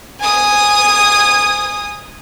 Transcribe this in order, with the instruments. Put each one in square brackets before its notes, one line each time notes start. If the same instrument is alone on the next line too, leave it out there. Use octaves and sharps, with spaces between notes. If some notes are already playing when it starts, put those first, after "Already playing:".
[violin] G#5 D#6